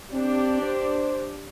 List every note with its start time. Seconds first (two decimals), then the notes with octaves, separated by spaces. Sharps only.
0.13 C4 D4 G4
0.63 C5